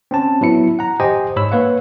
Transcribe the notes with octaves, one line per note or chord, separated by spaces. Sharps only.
C4 C#4 A5
F#3 B3 E4 C#7
F#5 A#5
G4 C5 D#5 G5 G#5
G#2 C#5 B5 E6
A#3 B4 C#5 F5 F#5